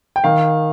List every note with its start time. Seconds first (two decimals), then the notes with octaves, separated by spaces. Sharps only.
0.16 G5
0.24 D#3 F5